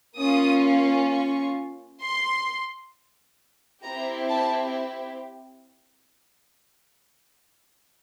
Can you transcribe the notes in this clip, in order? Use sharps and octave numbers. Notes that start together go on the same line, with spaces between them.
A#3 C#4 F4 D#6
C#6
C6
C4 E4 G4 A#5
A5